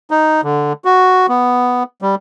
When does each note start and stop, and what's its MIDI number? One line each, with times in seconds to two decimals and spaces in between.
0.11 0.41 63
0.43 0.73 50
0.85 1.27 66
1.29 1.83 59
2.02 2.15 55